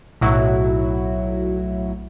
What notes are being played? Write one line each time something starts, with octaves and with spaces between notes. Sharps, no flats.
B1 A2 F#3 E4 F#4